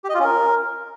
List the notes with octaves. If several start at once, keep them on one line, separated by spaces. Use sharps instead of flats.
G4
D#5
F4
C#4
A#4